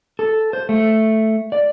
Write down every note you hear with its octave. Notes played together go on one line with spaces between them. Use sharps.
A4
C5
A3
D5